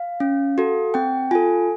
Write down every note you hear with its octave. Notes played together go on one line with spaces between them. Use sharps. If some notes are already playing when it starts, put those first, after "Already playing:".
Already playing: F5
C#4
F#4 A4
C4 G5
F4 A4 G#5